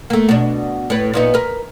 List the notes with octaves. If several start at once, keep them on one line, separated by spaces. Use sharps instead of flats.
A3 A#3
B2 D4
A2 B4
A#2 B3 D#4
A#4 B4